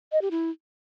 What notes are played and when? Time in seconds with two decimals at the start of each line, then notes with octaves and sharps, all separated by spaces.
0.12 D#5
0.22 G4
0.31 E4